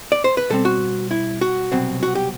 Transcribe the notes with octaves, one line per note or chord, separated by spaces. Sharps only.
D5
C5
B4
B2 G3 C4 A4
F#4
E4
F#4
C2 B2 F#3 C4
F#4
G4